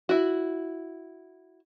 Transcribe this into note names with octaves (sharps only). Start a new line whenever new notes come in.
E4 F#4